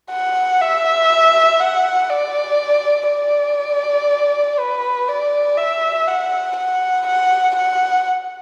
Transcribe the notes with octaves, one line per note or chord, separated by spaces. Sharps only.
F#5
E5
F#5
D5
D5
B4
D5
E5
F#5
F#5
F#5
F#5